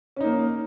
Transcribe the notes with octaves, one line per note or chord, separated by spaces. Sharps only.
A#3 C#4 D#4